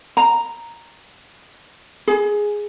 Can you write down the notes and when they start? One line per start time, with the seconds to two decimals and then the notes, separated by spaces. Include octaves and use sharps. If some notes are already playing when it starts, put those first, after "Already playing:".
0.17 A#5
2.07 G#4